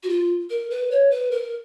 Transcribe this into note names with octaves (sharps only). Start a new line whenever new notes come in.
F#4
F4
A#4
B4
C#5
B4
A#4